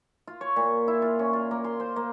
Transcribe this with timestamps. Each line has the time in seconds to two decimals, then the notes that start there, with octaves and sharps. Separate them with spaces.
0.28 F4
0.41 C#5
0.56 A#2
0.88 E4
1.02 F4
1.19 C#4
1.33 F4
1.51 A#3
1.64 C6
1.80 C5
1.96 A#3